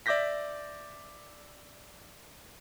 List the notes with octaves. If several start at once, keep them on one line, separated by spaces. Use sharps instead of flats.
D5 E5 D6 G6 A#6 B6